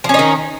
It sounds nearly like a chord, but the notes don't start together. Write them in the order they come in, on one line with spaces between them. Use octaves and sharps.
F3 C#4 D#4 D#3